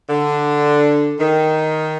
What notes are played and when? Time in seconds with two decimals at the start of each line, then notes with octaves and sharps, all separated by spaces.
0.09 D3
1.20 D#3